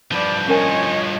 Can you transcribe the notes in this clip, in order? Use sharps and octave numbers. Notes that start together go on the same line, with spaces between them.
G2 F3 B4 D5
C#4 A#4 C#5 D#5 G#5